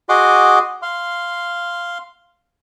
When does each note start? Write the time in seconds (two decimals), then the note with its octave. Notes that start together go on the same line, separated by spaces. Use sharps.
0.09 F#4 G#4 D#5 F#5 C6 D6
0.82 F5 C6